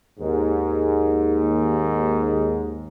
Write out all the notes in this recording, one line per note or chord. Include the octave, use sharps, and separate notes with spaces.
D#2 G#2